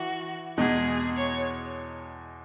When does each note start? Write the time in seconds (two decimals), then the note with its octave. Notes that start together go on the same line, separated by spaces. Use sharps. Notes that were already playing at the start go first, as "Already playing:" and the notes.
Already playing: E3 F#4
0.58 E2 B2 G#3 G#4
1.17 C#5